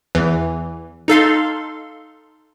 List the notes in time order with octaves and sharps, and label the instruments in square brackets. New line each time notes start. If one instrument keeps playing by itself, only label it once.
[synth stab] E2 E3
D#4 A4 F5 C6